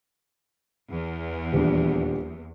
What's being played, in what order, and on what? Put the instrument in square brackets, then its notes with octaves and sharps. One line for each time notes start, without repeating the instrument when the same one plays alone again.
[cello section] E2
[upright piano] D#1 D4